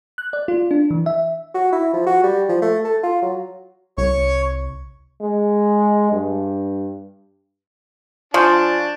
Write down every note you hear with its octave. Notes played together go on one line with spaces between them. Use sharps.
F#6
D5
F4
D4
E3
E5
F#4
E4
F3
F#4
G3
F3
A3
A4
F4
F#3
C2 C#5 C#6
G#3
G2
F3 D4 G#5 A5 C#6 G6